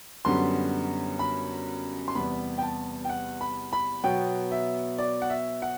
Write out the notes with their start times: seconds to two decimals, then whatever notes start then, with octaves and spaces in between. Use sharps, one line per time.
0.25 F#2 D3 G3 B3 C6
1.19 B5
2.08 C6
2.15 E2 C3 G3 B3 B5
2.58 G5
2.62 A5
3.05 G5
3.09 F#5
3.41 B5
3.73 B5
4.04 B2 F#3 B3 G5
4.51 E5
4.98 D5
5.22 F#5
5.30 E5
5.62 F#5